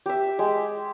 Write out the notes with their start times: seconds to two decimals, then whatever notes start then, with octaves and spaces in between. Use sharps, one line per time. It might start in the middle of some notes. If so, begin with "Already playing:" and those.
0.06 G4 E5
0.39 G#3 G5